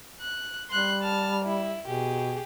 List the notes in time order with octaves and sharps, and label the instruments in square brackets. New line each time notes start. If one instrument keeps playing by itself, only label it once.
[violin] F#6
[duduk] G3 [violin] C6 F#6
[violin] A5 F6
E4
[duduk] B2 [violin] G4 G#4